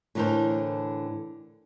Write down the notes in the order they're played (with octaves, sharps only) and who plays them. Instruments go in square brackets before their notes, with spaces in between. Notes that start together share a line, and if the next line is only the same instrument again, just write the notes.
[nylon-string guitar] A2 D3 E3 A4 A#4 C5